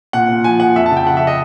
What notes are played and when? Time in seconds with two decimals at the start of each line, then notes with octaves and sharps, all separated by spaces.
0.13 A#2 F#5
0.28 A#2
0.44 F3 G#5
0.59 F3 F#5
0.76 F2 E5
0.86 A5
0.91 C#3
0.97 G5
1.06 F3 F#5
1.17 E5
1.27 D#5